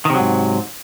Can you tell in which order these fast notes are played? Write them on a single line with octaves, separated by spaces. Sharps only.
D#3 C3 F#3 G#2